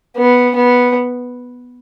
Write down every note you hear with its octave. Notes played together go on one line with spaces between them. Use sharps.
B3
B3